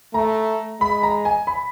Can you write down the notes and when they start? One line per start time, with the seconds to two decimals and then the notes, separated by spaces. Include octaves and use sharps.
0.14 A3 A#5
0.80 G#3 B5
1.03 A#5
1.25 G#5
1.47 B5